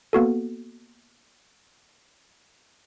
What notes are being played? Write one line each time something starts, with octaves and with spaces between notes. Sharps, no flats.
A#3 B3 F#4 A4